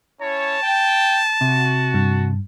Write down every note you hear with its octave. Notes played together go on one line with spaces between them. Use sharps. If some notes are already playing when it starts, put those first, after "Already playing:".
C#4 E4 C#5 A5
G5
C3 F#4
G2